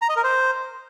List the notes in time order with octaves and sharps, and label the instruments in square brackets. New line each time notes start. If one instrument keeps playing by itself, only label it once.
[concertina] A#5
D#5
A#4
C5